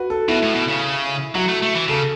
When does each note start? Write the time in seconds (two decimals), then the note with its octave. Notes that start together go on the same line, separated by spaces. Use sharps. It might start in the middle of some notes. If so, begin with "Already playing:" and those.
Already playing: F#4 B4
0.10 A4
0.28 B2 E4
0.42 A2
0.54 B2
0.68 C#3
1.35 F#3 F#4
1.48 A3
1.63 A3
1.75 E3
1.88 C#3 A4